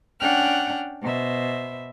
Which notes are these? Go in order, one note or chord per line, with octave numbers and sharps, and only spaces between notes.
C#4 D4 F#5 G5 F6 F#6
B2 C5 E5